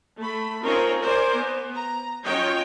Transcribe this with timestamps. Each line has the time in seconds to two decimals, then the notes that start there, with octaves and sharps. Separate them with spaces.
0.20 A3 B5
0.62 C4 C#4 D#4 F4 A#4 C#5
1.02 A#4 C5 D5 G#5
1.35 B3
1.76 A#5
2.25 F#3 C#4 F4 C#5 D#5 G5